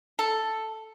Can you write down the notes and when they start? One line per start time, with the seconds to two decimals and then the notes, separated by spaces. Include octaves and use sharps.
0.19 A4